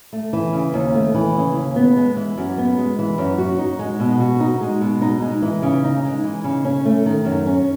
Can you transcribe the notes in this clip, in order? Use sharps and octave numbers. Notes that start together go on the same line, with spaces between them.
A3
E3
C#3
D#2
A3
E3
C#3
D#2
B3
G#3
E3
F#2
B3
G#3
E3
F#2
F#4
D#4
G#3
B2
F#4
D#4
G#3
B2
D#4
G#3
E3
C#3
D#4
G#3
E3
C#3
C#4
A3
D#3
F#2
C#4